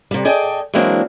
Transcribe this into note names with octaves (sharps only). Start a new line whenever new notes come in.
C3 G3
G#4 D5 D#5 G5 A5
E3 F#3 G#3 A#3 C4 D4